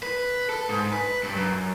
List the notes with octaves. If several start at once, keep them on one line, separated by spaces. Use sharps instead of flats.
B4
A4
G#2
B4
G2
F#2